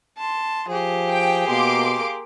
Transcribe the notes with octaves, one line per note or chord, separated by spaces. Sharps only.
A5 C6
F3 G4 G#4
G5
B2 A#3 C6 D6